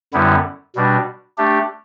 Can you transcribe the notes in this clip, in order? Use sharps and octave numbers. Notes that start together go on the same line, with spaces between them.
F#2 D3 G3 B3 E4
B2 G3 D4
A3 D4 G4